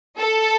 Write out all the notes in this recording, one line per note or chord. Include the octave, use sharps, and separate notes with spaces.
A4